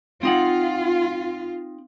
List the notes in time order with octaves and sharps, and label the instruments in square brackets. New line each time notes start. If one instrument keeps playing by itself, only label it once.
[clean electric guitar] C4 D#4 F#5 [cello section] F4